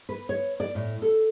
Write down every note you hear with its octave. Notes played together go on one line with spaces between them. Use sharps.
B4
C#5
D5
A2
A4